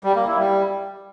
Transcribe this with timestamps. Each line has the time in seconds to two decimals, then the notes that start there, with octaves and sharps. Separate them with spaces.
0.04 G3
0.16 A#3
0.27 E4
0.39 G3